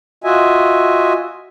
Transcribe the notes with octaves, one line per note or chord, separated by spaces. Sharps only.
F4 F#4 D#5 E5 G#5